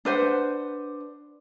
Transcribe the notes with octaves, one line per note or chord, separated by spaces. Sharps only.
D4 B4 C5 F#5